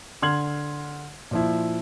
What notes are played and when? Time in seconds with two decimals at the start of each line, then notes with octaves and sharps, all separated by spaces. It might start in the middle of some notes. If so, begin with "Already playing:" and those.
0.22 D3 C6 F6 G#6 F#7
1.31 A#2 F3 E4